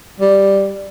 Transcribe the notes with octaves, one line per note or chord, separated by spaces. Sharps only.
G3